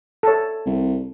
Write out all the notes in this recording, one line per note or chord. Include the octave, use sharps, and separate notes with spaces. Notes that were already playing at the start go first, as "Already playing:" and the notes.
A4 C#5
C2